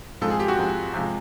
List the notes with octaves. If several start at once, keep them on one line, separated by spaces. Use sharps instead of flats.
G#2 F3 G#3 C4 A4
G#4
G4
F#4
G#2 F3 G#3 C4
C3 F3 G#3